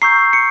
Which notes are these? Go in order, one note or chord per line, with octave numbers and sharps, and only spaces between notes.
A#5 C#6 E6 G6 C7
C#7